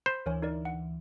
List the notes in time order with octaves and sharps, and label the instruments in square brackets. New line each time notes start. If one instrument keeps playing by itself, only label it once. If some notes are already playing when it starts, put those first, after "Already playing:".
[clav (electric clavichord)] C5 [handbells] B5 B6
[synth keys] D2 E3 [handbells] A#4 C#5 G#5
[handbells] D#4 A#4 D5
F#5